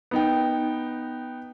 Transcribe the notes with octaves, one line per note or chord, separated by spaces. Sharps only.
B3 D#4 G5